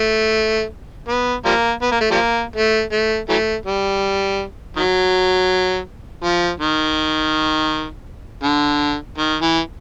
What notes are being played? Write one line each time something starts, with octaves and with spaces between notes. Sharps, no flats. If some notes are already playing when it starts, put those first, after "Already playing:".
Already playing: A3
B3
F3 G3 A#3
B3
A#3
A3
F3 G3 A#3
A3
A3
E3 F#3 A3
G3
D#3 F#3
F3
D#3
D3
D#3
E3